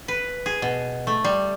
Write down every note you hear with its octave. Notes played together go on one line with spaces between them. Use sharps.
B4
G#4
B2
A3
G3